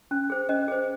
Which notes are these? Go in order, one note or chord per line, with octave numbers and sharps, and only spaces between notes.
C#4
G#4 C5
C#4 D#5
G#4 C5